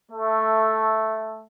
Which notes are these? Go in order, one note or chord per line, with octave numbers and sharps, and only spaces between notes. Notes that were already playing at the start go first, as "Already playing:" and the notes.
A3